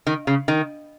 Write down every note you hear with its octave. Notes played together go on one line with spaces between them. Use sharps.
D#3
C#3
D#3